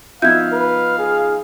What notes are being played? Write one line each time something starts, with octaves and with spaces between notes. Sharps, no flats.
F3 B3 D#4 E5 F5 G6 G#6
B4
G#4